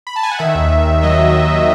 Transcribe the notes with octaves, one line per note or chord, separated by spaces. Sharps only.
B5
A5
G#5
F#5
D#3 E5
D#2
D#2
D#2
F#3 D#5
F#3
D#2
D#3